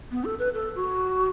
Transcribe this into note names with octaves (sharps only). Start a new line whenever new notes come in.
B3
A4
B4
A4
F#4